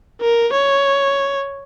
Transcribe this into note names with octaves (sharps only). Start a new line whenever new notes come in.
A#4
C#5